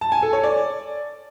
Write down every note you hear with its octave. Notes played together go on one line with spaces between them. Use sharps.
A5
G#5
A4
C#5
D5